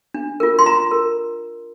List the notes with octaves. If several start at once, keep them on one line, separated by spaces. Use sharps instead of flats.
D4
F4 A#4
C6
F4 A#5
A#4